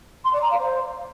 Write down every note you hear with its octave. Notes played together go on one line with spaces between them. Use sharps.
C6
D5
A#5
F5
C5